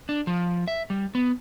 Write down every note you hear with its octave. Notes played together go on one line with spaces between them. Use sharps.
D4
F3
E5
G3
B3